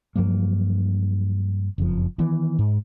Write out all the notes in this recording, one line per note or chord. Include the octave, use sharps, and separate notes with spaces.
G2 F3 F#3 A#3
F#1 F2 F3
D#3 E3 B3
G#2